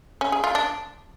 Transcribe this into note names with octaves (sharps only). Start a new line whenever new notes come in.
C#4
G#4
F4
D4